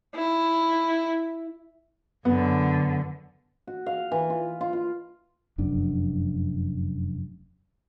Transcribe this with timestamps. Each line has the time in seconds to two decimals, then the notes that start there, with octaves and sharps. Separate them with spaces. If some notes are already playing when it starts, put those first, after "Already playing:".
0.15 E4
2.25 F#2 D3 B3
3.67 F#4
3.86 F5
4.12 E3
4.30 F4
4.61 F4
4.73 F4
5.58 F1 F#2 D4